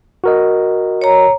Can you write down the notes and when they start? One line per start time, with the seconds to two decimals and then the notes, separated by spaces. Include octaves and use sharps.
0.24 F#4 A#4 D#5
1.02 C#5 A#5